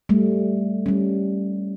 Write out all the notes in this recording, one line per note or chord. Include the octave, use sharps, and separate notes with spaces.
G3 A3
G3 C#4